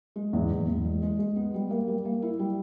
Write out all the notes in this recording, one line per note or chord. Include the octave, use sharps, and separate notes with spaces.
G#3
E2
E2
E2
G#3
G#3
G#3
B3
G3
A#3
G3
A#3
E4
G3